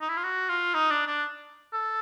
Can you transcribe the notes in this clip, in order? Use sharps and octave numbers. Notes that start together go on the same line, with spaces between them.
D#4
E4
F4
F#4
F4
D#4
D4
D4
A4